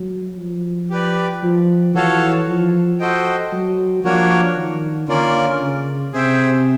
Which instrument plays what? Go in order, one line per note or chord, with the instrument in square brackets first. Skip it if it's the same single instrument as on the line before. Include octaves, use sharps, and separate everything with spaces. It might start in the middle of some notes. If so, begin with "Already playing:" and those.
Already playing: [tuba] F#3
F3
[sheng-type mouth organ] G4 B4 D5
[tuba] F3
[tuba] E3 [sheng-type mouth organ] F#4 A4 C#5 F5 A5
[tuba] F3
[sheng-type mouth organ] F#4 A4 C5 D#5 G5
[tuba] F#3
[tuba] F3 [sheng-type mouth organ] A#3 D4 F#4 A#4 C#5
[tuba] D#3
[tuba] D3 [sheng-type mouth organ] A#3 C#4 F4 A#4 D5
[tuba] C#3
[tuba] C3 [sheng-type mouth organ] G#4 C5 E5 G5